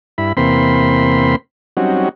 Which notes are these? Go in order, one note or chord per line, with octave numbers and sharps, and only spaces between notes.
G2 E4 B5
E2 C3 A#3 C4 B5 C6
F#3 G3 C4 C#4 D#4 F#4